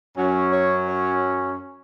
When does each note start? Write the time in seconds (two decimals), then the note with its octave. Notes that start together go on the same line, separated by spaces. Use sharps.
0.17 F#2 F#3 C#4
0.53 C#5
0.88 C#5